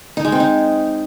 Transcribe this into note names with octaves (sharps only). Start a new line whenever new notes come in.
D#4
G#3
C4
D#4